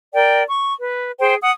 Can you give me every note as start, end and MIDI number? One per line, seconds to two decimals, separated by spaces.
0.14 0.43 70
0.14 0.43 74
0.14 0.43 79
0.49 0.74 85
0.80 1.11 71
1.19 1.36 68
1.19 1.36 72
1.19 1.36 79
1.42 1.51 78
1.42 1.51 87